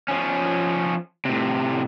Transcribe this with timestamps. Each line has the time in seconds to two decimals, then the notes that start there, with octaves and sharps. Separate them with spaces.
0.08 F3 C#4
1.25 A2 C3